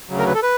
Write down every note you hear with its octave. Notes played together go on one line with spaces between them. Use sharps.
D2 C#3 F#3
A#4
B4
A4
B4